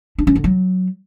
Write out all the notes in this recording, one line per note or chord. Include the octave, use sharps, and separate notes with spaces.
D4
C#4
D3
F#3